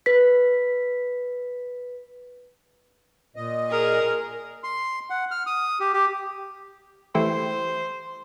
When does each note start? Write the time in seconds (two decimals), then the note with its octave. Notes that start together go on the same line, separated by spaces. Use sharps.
0.06 B4 B6
3.36 A#2 D#5
3.70 G#4 A#4
4.64 C6
5.10 F#5
5.31 F6
5.47 D#6
5.80 G4
5.93 G4
7.15 E3 A3 G4 C5